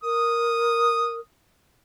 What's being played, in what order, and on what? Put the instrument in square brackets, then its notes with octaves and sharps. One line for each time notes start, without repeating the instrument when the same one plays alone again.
[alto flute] A#4 [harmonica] D#6